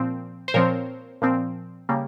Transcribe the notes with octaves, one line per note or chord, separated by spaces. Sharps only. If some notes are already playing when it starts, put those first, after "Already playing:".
Already playing: A#2 F3 C4
C5
A#2 F3 C4 A#4 C#5
A#2 F3 C4
C#3 G3 A#3